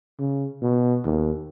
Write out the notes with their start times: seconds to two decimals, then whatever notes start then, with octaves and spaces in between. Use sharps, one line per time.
0.19 C#3
0.62 B2
1.04 D#2